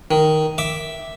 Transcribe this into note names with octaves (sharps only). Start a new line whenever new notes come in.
D#3
E5 D6